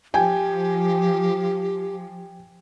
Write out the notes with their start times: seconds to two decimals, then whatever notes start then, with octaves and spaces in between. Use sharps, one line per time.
0.14 F3 G4 G5 G#5